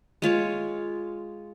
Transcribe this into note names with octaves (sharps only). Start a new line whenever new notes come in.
G#3 F4 C#5 C#6